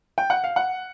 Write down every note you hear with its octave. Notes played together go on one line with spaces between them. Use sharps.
G5
F#5
F5
F#5